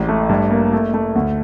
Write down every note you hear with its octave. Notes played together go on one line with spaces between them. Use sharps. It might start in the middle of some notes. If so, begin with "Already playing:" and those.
Already playing: A1 G#3
A3
G2
A#3
A3
A3
D2